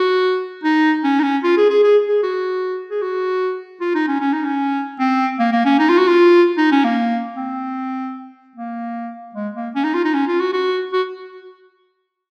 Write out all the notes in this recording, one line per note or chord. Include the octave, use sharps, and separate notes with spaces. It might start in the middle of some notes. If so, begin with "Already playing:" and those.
Already playing: F#4
D#4
C#4
D#4
C#4
F4
G#4
G#4
G#4
G#4
F#4
G#4
F#4
F4
D#4
C#4
C#4
D#4
C#4
C4
A#3
A#3
C#4
D#4
F4
F#4
F4
D#4
C#4
A#3
C4
A#3
G#3
A#3
C#4
D#4
F4
D#4
C#4
F4
F#4
F#4
F#4